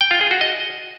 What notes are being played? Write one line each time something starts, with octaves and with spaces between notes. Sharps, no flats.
G5
F4
G#4
F#4
D#5